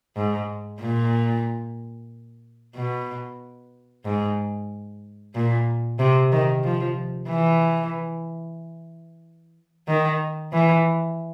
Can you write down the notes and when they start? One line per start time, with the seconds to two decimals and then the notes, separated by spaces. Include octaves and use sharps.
0.16 G#2
0.81 A#2
2.75 B2
4.05 G#2
5.35 A#2
5.99 C3
6.32 D#3
6.64 F3
7.29 E3
9.88 D#3
10.53 E3